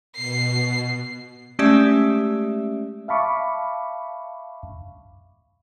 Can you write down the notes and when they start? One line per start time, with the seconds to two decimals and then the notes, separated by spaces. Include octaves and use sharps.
0.16 B2 C7
1.59 G#3 A3 C#4 G4 D5 E5
3.08 E5 F5 A5 B5 C#6 D6